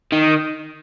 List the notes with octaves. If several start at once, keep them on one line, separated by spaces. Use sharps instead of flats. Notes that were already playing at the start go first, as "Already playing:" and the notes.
D#3